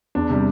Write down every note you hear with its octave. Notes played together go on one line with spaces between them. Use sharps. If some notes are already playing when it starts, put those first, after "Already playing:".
E2 D4
C3 G3